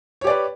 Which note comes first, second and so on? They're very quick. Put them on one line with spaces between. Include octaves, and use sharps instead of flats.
C#5 G4 D5 B4